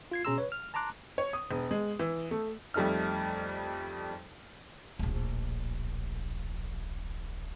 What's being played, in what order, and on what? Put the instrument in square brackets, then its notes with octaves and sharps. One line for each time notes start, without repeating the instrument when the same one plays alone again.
[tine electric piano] F4 G#6 C7
B2 C#4 G#4 A#5 C6 E6
B4 C#5
F6
A5 A#5 C6 D6 F#6
[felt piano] C#5
D#6
E1
G#3
E3
A3
[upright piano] F2 G3 A3 D#4 F6
[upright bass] D1 A#1